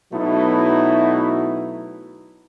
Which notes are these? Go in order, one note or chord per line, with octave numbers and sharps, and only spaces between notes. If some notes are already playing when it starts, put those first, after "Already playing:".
B2 F#3 A3 D#4 E4